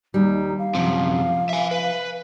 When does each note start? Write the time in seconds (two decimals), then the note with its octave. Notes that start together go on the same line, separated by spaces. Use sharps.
0.14 D#2 G3 D#4
0.59 F5
0.75 F#2 C3 F3
1.49 E5 G#5
1.71 B4